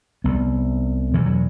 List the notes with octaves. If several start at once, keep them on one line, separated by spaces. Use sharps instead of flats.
C2 C3 B3
E2 B2 E3
F#3